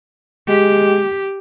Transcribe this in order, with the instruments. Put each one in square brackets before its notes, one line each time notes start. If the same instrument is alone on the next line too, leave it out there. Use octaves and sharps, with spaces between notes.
[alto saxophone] G#3 [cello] G4